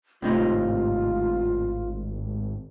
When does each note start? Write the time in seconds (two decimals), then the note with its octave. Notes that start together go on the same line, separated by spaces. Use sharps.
0.22 G#1 A2 C3 D#4 F4